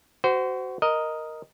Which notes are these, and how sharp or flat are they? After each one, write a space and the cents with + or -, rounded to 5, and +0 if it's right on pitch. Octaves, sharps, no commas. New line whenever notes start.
F#4 +20 C5 -25
A#4 +0 D#5 +0